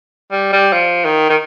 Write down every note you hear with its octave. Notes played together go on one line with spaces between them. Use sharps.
G3
G3
F3
D#3
D#3